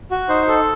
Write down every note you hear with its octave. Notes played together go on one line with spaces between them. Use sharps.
F#4
D#4 C5
A4